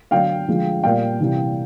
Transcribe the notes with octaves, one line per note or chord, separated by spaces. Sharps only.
D3 F#3 F5 G5
D3 F3 G#3
A#2 G3 F5 G5
C3 E3 G3